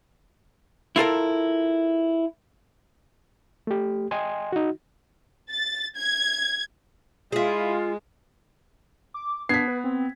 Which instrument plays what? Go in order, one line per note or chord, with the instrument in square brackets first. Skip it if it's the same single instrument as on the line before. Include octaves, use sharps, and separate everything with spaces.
[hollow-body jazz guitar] E4 F4 A4 A#4
[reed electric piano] A3 G4
D#5 G5 G#5 C6
D#4 F#4
[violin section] A6
G#6
[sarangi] G#3 [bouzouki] E4 G#4 [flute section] F4
[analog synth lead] D6
[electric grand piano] B3 C7 [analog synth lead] D4 [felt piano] G#6 B6
[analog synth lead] B4
C4